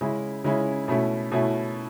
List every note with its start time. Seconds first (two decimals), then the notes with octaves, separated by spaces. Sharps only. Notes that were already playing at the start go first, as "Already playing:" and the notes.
0.01 C#3 G#3 C#4 E4
0.44 C#3 G#3 C#4 E4
0.88 B2 A3 C#4 E4
1.32 B2 A3 C#4 E4